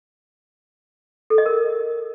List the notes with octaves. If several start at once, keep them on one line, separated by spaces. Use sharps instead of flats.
A4
D#5
A#4